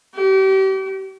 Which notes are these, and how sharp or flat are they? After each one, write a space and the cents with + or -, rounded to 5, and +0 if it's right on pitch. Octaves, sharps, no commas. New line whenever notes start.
G4 -35